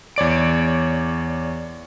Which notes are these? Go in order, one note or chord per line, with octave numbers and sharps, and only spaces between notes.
E2 C#5 D5 D7